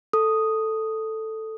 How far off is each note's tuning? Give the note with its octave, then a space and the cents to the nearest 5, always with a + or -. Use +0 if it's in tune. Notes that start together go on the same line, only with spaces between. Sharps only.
A4 +0 D#6 +0